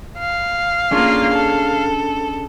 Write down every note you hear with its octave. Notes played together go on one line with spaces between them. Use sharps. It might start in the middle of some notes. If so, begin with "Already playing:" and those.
F5
A#3 C#4 D4 F4 G#4
A4